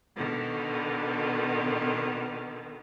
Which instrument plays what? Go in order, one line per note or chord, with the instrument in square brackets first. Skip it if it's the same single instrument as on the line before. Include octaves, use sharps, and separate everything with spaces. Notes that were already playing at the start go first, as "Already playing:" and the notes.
[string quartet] B2 D3 D#3